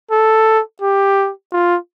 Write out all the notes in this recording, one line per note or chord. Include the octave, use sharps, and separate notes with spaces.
A4
G4
F4